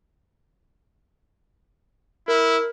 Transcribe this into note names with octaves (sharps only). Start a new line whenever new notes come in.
E4 A#4